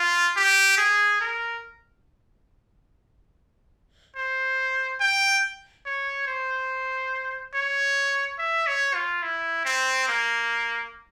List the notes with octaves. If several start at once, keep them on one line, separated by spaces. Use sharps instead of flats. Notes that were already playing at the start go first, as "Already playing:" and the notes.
Already playing: F4
G4
G#4
A#4
C5
G5
C#5
C5
C#5
E5
C#5
F4
E4
C4
A#3